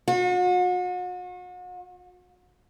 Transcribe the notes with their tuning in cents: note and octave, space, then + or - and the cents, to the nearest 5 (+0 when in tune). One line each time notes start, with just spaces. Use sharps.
F#4 -40